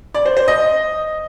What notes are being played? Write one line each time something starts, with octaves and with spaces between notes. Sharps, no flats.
D5
C5
C5
D#5